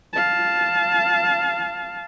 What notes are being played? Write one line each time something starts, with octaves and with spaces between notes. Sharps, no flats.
F5 A5